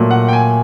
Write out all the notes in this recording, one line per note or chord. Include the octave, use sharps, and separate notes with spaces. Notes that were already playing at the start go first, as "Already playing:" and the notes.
Already playing: A#2 F#3 A3
F#5
G5
G#5